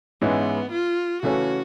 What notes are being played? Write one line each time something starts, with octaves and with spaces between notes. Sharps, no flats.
G#2 E3 G#3 B3 C#4 E4
F4
C#3 E3 A3 C#4 F#4